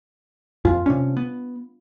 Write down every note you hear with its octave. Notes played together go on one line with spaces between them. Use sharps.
F2 F4
C3 C#4 D4
B3